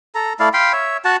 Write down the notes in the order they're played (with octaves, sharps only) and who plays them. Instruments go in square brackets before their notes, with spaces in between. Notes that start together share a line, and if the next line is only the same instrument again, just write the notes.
[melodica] A4 A#5
A3 E4 D5 F5
F5 G5 B5 C6
C#5 E5
F#4 F#5 A5